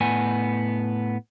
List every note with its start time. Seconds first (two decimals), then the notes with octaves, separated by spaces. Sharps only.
0.01 A2 B3 G#5